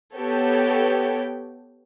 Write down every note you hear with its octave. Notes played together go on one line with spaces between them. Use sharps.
B3 G4 A4 C#5 G5